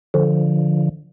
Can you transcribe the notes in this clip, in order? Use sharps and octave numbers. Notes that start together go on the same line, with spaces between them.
D3 F3